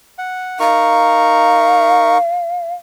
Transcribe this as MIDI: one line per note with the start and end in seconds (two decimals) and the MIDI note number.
0.19 0.59 78
0.60 2.18 63
0.60 2.18 70
0.60 2.74 77
0.60 2.18 85